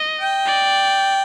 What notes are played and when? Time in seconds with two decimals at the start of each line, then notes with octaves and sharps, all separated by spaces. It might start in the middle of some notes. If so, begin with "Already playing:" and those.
Already playing: D#5
0.20 G5
0.46 D5